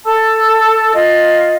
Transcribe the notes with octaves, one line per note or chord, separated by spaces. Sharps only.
A4 A5 E6
F4 D#5